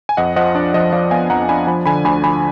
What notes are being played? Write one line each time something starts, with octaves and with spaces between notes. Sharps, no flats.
G#5
F2 D#5 F#5
F3 D#5 F#5
D4 D5
F3 D#5
F3 D5 F5
B3 F5 G#5
F2 F#5 A#5
D4 G#5 B5
F3 G#5 B5
D3 G#5 B5
D2 G#5 B5
F3 G#5 B5